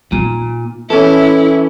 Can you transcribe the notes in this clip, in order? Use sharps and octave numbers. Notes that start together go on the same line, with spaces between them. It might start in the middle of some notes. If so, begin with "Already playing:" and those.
A#2 D#4
E3 C#4 E4 A4